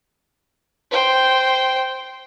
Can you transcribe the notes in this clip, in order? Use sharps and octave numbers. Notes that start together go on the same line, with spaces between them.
C5 G5